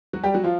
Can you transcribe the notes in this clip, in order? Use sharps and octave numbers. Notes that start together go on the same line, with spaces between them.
F#3 F#4
G3 G4
F#3 F#4
F3 F4